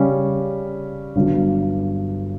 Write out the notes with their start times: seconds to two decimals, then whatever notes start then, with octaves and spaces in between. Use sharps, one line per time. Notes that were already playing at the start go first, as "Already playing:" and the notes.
Already playing: C#3 G3 C#4
1.16 G1 G2 F#3